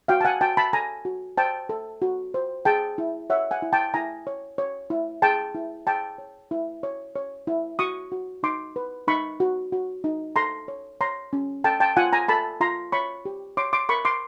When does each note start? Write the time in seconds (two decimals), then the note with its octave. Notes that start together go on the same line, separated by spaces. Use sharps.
0.08 F#4 F5 G5
0.21 A5
0.25 F#5 G#5
0.41 F#4 G5 A5
0.57 A5 B5
0.73 A4 G#5 A#5
1.05 F#4
1.37 C5 G5 A5
1.69 A4
2.02 F#4
2.34 C5
2.65 G#4 G5 A5
2.98 E4
3.30 C#5 E5 F#5
3.51 F#5 G#5
3.62 E4
3.73 G5 A5
3.94 E4 G#5 A#5
4.27 C#5
4.58 C#5
4.90 E4
5.22 G#4 G5 A5
5.55 E4
5.87 G#4 G5 A5
6.18 C#5
6.51 E4
6.83 C#5
7.15 C#5
7.47 E4
7.79 F#4 C#6 D#6
8.12 F#4
8.43 D#4 C6 D6
8.76 B4
9.08 D#4 B5 C#6
9.40 F#4
9.72 F#4
10.04 D#4
10.36 A4 A#5 C6
10.68 C#5
11.01 C#5 A#5 C6
11.33 C#4
11.64 A4 G5 A5
11.80 G5 A5
11.97 F4 F#5 G#5
12.13 G#5 A#5
12.28 A4 A5 B5
12.61 F4 A#5 C6
12.92 C#5 B5 C#6
13.25 G4
13.57 C#5 C6 D6
13.73 C6 D6
13.89 A#4 B5 C#6
14.05 C6 D6